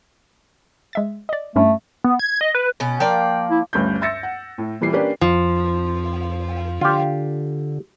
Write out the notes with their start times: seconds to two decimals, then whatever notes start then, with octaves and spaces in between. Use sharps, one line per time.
0.93 G#3 E5 A6
1.29 D5 D#5
1.56 G2 A3 C#4 E4
2.04 B3
2.19 G#6
2.41 D#5
2.55 B4
2.80 B2 C#4
3.00 F3 A#3 D5 G5
3.51 E4
3.73 G1 D2 G2 C#4 G6
4.01 E5 C6 E6 A6 A#6 C#7
4.23 F#5
4.58 A2
4.81 A#2 E3 G3 C7
4.93 A#3 C#4 D4 G4 B4 D5
5.21 F2 F3
6.81 D3 F4 G4